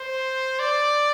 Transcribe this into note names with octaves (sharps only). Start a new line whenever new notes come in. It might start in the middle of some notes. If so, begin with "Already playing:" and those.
Already playing: C5
D5